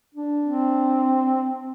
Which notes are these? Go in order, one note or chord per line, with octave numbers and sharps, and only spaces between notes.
D4
C4